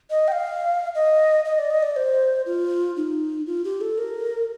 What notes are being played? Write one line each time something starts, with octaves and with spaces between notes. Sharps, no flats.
D#5
G5
F5
D#5
D#5
D5
D#5
D5
C5
F4
D#4
F4
G4
A4
A#4